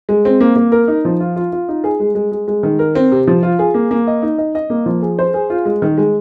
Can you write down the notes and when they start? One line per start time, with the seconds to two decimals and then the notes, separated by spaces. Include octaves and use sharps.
0.09 G#3
0.25 C4
0.41 A#3
0.56 A#3
0.72 A#4
0.88 D#4
1.05 F3
1.20 F4
1.36 F4
1.53 F4
1.69 D#4
1.84 G#4
2.00 G#3
2.15 G#3
2.32 G#3
2.48 G#3
2.63 D#3
2.79 A#4
2.95 C4
3.12 C3
3.27 F3
3.43 F4
3.59 G#4
3.74 A#3
3.91 A#3
4.07 D#5
4.22 D#4
4.38 D#5
4.55 D#5
4.70 A#3
4.86 F3
5.02 G#4
5.19 C5
5.34 G#4
5.50 F4
5.65 G#3
5.82 D#3
5.98 G#3